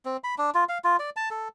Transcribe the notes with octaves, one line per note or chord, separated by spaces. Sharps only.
C4
B5
D4
F4
F5
F4
D5
A5
A4